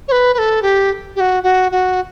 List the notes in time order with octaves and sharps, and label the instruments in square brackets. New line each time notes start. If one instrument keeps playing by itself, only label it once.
[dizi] C#5
B4
B4
A4
G4
G4
F#4
F#4
F#4